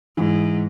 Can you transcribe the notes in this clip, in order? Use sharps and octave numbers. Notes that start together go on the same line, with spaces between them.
G#2 E3